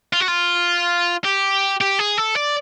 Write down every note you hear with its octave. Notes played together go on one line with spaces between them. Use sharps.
F4
F#4
F4
G4
G4
G#4
A4
D5